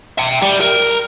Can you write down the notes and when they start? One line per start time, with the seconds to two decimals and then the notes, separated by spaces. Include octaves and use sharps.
0.18 E5 G5
0.43 G3
0.61 A#4